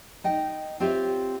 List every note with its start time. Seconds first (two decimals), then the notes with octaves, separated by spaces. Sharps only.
0.24 D#4 D#5 G5
0.80 C4 F4 G4 C#5 E5